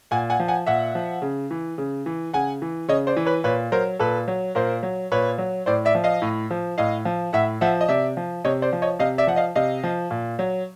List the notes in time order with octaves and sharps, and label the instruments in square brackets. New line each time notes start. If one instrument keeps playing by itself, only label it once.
[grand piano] A#2 F#5 G#5
F#5 G#5
F3
F#5 G#5
A#2 E5 F#5
F3
C#3
E3
C#3
E3
C#3 F#5 G#5
E3
C#3 C#5 D#5
C5 D5
E3
B4 C#5
A#2 B4 C#5
F#3 A#4 C5
A#2 A4 B4
F#3
A#2 A#4 C5
F#3
A#2 B4 C#5
F#3
A2 C5 D5
D5 E5
F3
D#5 F5
A2
F3
A2 D#5 F5
F3
A2 E5 F#5
F3 E5 F#5
D#5
C3 D5 E5
F3
C3 C#5 D#5
C5 D5
F3
C#5 D#5
C3 D#5 F5
D5 E5
F3 F#5
D#5 F5
C3 D#5 F5
F3
A#2
F#3